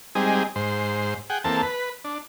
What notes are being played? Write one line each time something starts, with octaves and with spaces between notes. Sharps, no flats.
G3 G#3 C4 D#4 G#4
G#2 C5
G#4 F#5 G5
E2 A#3 C4 A4 A5
B4
D4